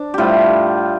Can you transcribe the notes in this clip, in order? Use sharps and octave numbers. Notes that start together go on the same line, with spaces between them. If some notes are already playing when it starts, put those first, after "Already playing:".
Already playing: D4
A2 G3 F4 G4